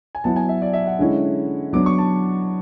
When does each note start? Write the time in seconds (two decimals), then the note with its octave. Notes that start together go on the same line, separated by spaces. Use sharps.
0.15 G#5
0.24 F#3 B3 E4 A5
0.36 G#5
0.49 E5
0.62 D5
0.73 E5
0.86 F#5
0.99 D3 G#3 C#4 E4
1.73 F#3 B3 D4 D6
1.86 C#6
1.98 A5